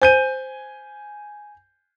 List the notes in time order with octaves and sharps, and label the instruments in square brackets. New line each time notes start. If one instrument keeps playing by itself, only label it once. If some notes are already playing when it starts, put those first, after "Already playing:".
[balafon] C5 [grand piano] G#5 G6 D#7